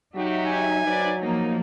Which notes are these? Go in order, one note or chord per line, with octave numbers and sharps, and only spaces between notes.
F#3 D#4 F#4 G4 E5
G#5
F#3 B4 C5 D5
F3 A#3 D#4